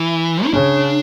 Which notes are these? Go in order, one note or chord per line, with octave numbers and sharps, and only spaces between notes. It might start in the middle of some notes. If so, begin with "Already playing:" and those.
Already playing: E3
E4
C#3 D4